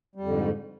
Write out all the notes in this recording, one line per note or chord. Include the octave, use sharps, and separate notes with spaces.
F2 G#2 D3 G3